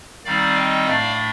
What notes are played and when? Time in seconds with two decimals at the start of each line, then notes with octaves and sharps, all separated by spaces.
0.25 D#3 G3 C4 D#4 D5 F5
0.55 D#5 G5
0.86 A2 A3 D4 D5 F5